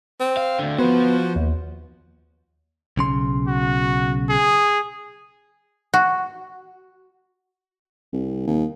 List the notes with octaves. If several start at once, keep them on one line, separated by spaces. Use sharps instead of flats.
C4
F5
D2 D3
F3 B3 F#4 B4 C5
D#2
B1 C#3 C6
F#4
G#4
F#4
C2
D#2